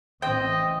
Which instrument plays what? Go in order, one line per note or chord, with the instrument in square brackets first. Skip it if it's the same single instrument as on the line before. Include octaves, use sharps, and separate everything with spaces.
[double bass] A1 E3 [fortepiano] C4 C5 [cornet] D#5 [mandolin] G5